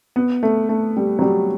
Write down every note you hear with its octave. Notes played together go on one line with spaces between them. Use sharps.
B3
A3
A3
G3
F#3
G3